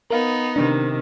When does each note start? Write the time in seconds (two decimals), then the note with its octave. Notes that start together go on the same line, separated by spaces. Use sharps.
0.11 B3 D#4 A#4 F5
0.56 C3 D#3 D4